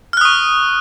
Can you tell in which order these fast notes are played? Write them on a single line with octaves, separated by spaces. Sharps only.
F6 F#6 D#6 C#6